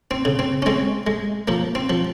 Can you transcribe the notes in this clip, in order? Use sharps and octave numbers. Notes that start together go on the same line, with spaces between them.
C4
C#3
C4
C#4
G#3 C4
G#3
F3 A#3
C4
F3